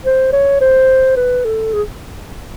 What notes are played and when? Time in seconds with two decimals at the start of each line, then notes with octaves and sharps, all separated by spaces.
0.05 C5
0.33 C#5
0.61 C5
1.17 B4
1.45 A4
1.73 G#4